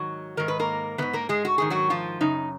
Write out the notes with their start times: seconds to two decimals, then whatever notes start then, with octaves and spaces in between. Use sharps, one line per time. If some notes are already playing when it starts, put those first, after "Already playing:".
Already playing: G#2 D#3 F#3 F#4
0.37 G#2 D#3 A#4
0.48 B4
0.59 A#3 A#4
0.98 G#2 D#3 B3 B4
1.13 A#3 A#4
1.29 G#3 G#4
1.45 F#4
1.58 G#2 D#3 G#4
1.70 F#3 F#4
1.90 F3 F4
2.21 F#2 C#3 D#4